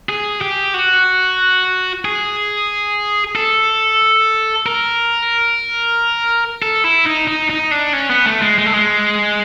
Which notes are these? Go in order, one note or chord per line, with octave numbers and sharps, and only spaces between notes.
G#4
G4
F#4
G#4
A4
A#4
A4
E4
D#4
D#4
D#4
D4
C#4
B3
A3
G#3
G#3
A3
G#3